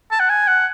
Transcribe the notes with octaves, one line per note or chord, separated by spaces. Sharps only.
A5
F#5
G#5
F#5